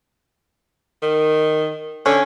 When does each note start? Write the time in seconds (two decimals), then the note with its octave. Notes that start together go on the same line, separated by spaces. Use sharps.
1.02 D#3
2.06 D3 C#4